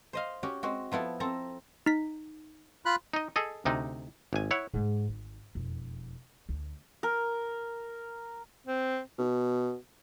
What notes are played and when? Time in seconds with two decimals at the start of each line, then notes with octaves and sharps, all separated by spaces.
0.13 C5 D#5 F5
0.43 C#4 F#4 G4
0.63 G#3 C4 F#4
0.92 F3 B3 E4 A4
1.20 C4 A4 A#5
1.86 D#4 B6
2.86 F4 B5 F#6
3.13 D#4 D#5
3.36 G#4 A4 D#5
3.65 D2 C3 D#4
4.33 G#1 G#5
4.51 E4 C#5 F#5
4.74 G#2 G#3
5.09 G#1
5.55 E1 F2
6.49 D2
7.03 A#4
8.67 C4
9.18 B2